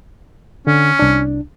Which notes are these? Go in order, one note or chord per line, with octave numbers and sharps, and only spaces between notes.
D3 C#4
C2 D4